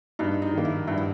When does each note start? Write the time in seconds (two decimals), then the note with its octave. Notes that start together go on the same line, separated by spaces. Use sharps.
0.19 G2 D#4
0.42 D#4
0.53 D#3 A#3
0.65 E4
0.87 G2 E4
0.97 E4